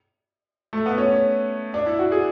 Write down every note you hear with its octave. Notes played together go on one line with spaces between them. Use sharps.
A3
B3
C#4
C#4
D4
E4
F#4
G#4